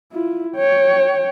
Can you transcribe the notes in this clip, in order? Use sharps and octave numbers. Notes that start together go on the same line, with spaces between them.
E4 F4
C#5 G5